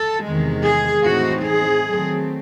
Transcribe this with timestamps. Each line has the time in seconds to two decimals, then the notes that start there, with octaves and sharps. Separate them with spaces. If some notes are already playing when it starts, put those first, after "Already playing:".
Already playing: A4
0.24 E2 C3 D#3 G#3
0.64 G#4
1.04 A2 E3 C4 D#4 F#4
1.44 G#4
1.85 D#3 F#3 A3 C4